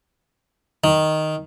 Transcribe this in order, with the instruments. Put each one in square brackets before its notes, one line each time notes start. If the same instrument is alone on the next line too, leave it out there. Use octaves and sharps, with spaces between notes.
[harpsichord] D#3